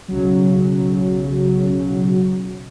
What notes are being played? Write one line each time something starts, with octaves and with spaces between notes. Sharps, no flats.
B1 C#3 F#3